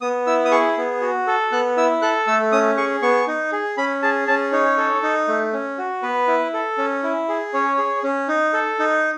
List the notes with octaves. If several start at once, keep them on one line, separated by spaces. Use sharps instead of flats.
B3 D#6
E4 E6
D#6
G#4 C#6
B3
F#4
A4
B3 F#6
E4 E6
A4 F#6
A3 E6
C#4 D#6
G#4 C#6
B3 C#6
D#4
G#4
C#4 B5
G#4 A5
C#4 A5
D#4 C#5
A4
D#4
A3
C#4
F#4
B3 B4
E4
A4
C#4
E4
G#4
C#4 C#5
G#4
C#4
D#4
A4
D#4